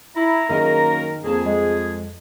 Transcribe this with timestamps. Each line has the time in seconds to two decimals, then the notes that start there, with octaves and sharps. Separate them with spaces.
0.16 E4 A#5
0.50 F#2 D#3 A#3 G#4 A#4
1.24 F2 A#3 G#4 A4 A5
1.45 G#3